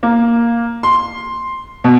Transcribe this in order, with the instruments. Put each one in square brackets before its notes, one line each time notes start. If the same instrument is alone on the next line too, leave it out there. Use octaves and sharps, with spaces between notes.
[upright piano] A#3
C6
B2